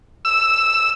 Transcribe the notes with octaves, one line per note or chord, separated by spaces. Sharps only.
E6